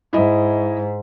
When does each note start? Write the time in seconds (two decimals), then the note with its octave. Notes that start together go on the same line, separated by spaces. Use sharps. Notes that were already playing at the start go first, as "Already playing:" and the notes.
0.13 G#2 E4 D#5 E5